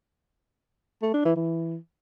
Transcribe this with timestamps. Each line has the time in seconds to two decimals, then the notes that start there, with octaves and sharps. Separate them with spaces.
1.02 A3
1.14 D4
1.25 E3
1.36 E3